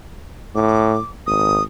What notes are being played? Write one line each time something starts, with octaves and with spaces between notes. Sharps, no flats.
A2 D6
G#1 D#6